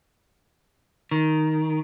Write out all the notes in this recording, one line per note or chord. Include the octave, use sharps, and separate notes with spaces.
D#3